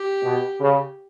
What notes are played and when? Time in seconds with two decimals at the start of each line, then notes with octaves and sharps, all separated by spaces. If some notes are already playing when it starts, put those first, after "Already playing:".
Already playing: G4
0.23 B2
0.60 C#3